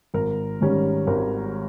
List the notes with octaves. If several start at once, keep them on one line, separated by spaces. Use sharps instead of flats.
G#1 A#4
G#2 D#3 G3 C#4
G#1 A#4